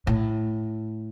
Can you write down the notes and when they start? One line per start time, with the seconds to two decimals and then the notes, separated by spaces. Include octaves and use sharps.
0.07 A2